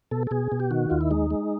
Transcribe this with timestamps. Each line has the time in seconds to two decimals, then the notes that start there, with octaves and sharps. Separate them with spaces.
0.11 B2 A4
0.27 A4
0.31 B2 G#4
0.52 B2
0.60 G4
0.71 D#3 F#4
0.90 D#2 F4
1.01 E4
1.11 G#3 D#4
1.30 G#3